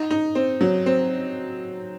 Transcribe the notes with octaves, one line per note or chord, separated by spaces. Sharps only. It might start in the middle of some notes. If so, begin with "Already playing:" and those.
Already playing: D#4
D#4
C4
F#3
C4